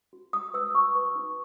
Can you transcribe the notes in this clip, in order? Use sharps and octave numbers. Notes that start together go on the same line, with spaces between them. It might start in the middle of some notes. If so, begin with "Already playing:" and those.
F#4
F#4 D#6
B4 E6
F#4 C#6
B4
D#4